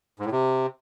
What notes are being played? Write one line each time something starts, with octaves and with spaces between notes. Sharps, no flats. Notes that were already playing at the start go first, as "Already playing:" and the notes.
G#2
A2
C3